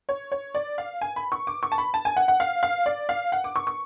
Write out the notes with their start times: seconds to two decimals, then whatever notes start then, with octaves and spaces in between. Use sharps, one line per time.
0.09 C#5
0.32 C#5
0.55 D5
0.78 F5
1.01 G#5
1.16 B5
1.32 C#6
1.47 D6
1.63 C#6
1.72 A5
1.78 B5
1.94 A5
2.05 G#5
2.17 F#5
2.28 F#5
2.40 F5
2.63 F5
2.86 D5
3.09 F5
3.32 F#5
3.44 D6
3.56 C#6
3.67 C#6